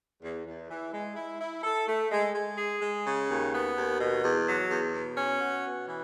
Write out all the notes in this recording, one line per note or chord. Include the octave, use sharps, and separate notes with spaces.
E2
E2
E3
G#3
E4
E4
A4
A3
G#3
G#3
G#4
G#3
C#3
D#2
B3
D#2
B2
E2
F#3
E2
B2
C#4
F#4
B2
E3